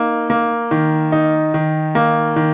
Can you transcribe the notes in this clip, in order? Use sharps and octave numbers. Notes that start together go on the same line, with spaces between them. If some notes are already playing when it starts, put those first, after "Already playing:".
Already playing: A#3 D#4
A#3
D#3
D#4
D#3
A#3
D#3